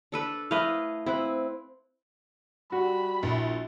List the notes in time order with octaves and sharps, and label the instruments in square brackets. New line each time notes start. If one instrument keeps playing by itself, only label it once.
[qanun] D4 A4 B4
[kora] A3 E4 B4 [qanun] D#5 F5
[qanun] C4 [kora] E4 B4
[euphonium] G3 [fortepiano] F#4 [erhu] B5
[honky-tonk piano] A#1 [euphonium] E4